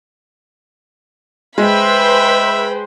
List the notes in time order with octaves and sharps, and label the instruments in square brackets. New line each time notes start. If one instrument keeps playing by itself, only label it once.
[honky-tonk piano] G#3 [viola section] B4 C5 [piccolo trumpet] E5 [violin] G5 B5